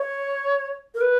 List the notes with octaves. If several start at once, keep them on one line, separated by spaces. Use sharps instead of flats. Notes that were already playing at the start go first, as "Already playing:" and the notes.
Already playing: C#5
A#4
B4